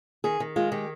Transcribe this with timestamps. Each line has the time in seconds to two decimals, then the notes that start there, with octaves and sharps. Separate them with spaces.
0.24 D#3 G#4
0.40 D#3
0.56 G#3 F4
0.72 D#3 G4